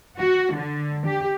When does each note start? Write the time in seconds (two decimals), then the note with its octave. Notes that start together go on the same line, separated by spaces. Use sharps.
0.18 F#4
0.55 D3
1.06 G4